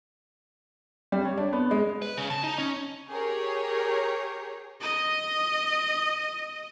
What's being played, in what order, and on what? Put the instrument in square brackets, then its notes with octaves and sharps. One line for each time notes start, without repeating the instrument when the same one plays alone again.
[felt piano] G3
C#5
D4
B3
G#3
[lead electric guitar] B4
C#3
A5
D#4
C#4
[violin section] G4 G#4 A#4 C#5
[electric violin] D#5 D#6